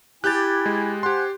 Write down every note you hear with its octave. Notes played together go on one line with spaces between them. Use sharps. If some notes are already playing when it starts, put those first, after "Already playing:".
E4 G4 G#5 F#6 G6 A6
G#3
G4 C5 F#5 G#5 C6